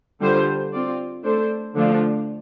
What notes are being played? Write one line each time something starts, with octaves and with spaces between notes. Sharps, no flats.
D3 G3 F4 C5
C4 F4 D5
A3 D4 A4 C5
D3 F3 A3 D4 F4